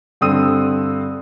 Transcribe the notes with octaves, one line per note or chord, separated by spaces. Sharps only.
G2 D3 C4 D#6 E6 D#7